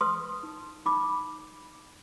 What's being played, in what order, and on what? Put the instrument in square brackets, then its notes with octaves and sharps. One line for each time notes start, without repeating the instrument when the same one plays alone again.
[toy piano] B4 C6 D#6
D#4
D#4 B5 D6